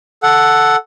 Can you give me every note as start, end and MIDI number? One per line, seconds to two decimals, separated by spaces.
0.23 0.76 69
0.23 0.76 78